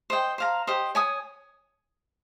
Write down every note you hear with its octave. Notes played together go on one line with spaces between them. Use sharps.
C5 D#5 G5
C5 F5 A#5
G4 C5 D#5
C#5 G#5 D#6